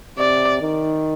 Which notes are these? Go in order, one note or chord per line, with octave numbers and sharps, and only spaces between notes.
C3 D5
D#3